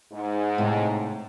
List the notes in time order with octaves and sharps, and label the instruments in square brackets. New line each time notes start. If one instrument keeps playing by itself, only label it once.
[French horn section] G#2
[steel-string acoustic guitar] A2 C3